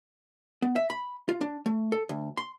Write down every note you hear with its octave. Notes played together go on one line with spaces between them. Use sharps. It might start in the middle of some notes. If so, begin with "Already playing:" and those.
B3
E5
B5
F4
D4
A3
A4
D2
C6